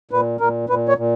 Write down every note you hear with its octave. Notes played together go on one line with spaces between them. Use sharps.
A#2 B4
A#2 A#4
A#2 B4
C#5
A#2